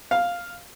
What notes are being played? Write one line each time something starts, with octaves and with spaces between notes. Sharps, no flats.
F5